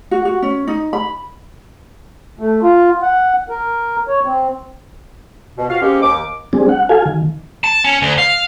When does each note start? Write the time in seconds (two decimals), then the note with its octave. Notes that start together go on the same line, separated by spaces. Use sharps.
0.11 F#4
0.25 F#4
0.42 C#4
0.67 D#4
0.93 B5
2.39 A3
2.63 F4
3.02 F#5
3.49 A#4
4.08 C#5
4.25 C4
5.57 B2
5.69 F4 F#4 F5
5.82 G#3 A#3 C4 C#4 G4
6.03 D#2 D6
6.53 G3 C4 D4 G#4
6.69 F#5
6.89 F#4 A4 F5 G#5
7.06 D#3
7.64 A5
7.84 C#4
8.02 D2
8.18 F5